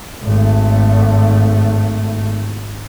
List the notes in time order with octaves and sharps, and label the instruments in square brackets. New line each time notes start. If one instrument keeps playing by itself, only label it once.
[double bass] G#1 A3